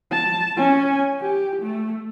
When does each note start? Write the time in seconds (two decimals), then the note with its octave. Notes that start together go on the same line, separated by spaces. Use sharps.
0.12 A5
0.56 C#4 G#5
1.21 G4
1.62 A3